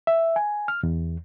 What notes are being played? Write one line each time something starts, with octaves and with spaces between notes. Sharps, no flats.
E5
G#5
F6
E2